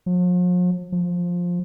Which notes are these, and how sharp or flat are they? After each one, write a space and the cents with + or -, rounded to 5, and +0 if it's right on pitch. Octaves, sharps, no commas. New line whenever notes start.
F3 +45
F3 +10